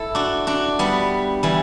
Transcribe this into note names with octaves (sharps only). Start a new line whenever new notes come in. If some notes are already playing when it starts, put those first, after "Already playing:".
Already playing: E4 A4
D4 F#4
D4 F#4
G3 B3
E3 G3